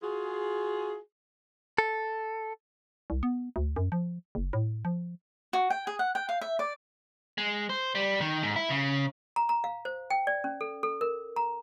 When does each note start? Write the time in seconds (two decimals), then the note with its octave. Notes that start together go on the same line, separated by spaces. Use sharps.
0.03 F4 F#4 G#4
1.78 A4
3.10 C2
3.23 B3
3.56 D2
3.76 F#2
3.92 F3
4.35 F#1
4.53 A2
4.85 F3
5.53 F#4
5.70 G5
5.87 G#4
5.99 F#5
6.15 G5
6.29 F5
6.41 E5
6.59 D5
7.38 G#3
7.70 C5
7.95 G3
8.21 D#3
8.43 G#2
8.56 E4
8.70 C#3
9.36 A#5
9.49 A#5
9.64 F5
9.85 C5
10.10 G5
10.27 D5
10.44 C#4
10.61 A4
10.83 A4
11.01 A#4
11.36 A#5